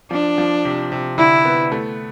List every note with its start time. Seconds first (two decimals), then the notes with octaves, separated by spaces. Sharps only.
0.11 F3 D4
0.38 F3
0.65 C3
0.92 C3
1.18 D3 E4
1.45 B3
1.72 A3